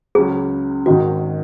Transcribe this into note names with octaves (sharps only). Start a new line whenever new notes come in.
C#2 C#3 F#3 C#4 G#4
G#1 G#2 D#3 F#4